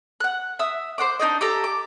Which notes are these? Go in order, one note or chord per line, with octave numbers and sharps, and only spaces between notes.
F#5 F#6
E5 D#6 E6
C5 C#5 F#5 D6
D4 D#4 D5 D#5
G4 A4 A#5
D6